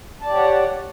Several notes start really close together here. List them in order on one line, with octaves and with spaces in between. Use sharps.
A5 D5 G4 C#5 F#5